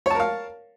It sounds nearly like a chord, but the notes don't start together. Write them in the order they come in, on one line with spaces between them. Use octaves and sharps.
C#5 A5 A#4 F5